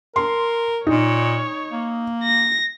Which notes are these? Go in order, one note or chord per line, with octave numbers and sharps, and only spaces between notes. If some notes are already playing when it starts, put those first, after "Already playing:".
A#4 C6
A#2 D#4 C#5
A#3
A#6